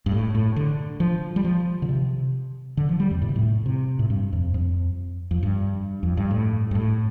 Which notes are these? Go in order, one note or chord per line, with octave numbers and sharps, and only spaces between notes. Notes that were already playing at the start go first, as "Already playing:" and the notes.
G2
A2
A2
D3
F3
G3
F3
D3
C3
D3
F3
G3
F2
A2
C3
A2
C3
A2
G2
F2
F2
F2
G2
F2
G2
A2
G2
A2